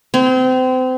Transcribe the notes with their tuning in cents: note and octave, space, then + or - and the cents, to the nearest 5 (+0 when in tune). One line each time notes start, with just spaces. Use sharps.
C4 -30